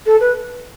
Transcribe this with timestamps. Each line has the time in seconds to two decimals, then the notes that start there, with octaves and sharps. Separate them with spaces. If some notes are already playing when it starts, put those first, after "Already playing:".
0.06 A4
0.21 B4